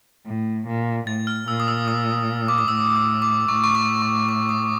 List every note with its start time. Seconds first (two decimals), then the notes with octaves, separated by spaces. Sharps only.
0.27 A2
0.67 A#2
1.07 A2 A6
1.27 F6
1.48 A#2 E6
1.60 D#6
1.68 E6
1.88 D#6
2.48 D6
2.58 D#6
2.68 A2 E6
2.96 D#6
3.22 D6
3.48 A2 C#6
3.64 C#6
3.75 D6
4.02 C#6
4.29 D6
4.49 D#6